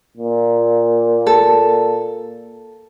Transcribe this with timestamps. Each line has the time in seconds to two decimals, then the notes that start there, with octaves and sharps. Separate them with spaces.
0.17 A#2
1.27 A4